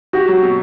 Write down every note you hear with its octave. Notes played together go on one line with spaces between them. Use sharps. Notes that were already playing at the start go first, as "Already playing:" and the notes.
F#4 G4
F#3
B2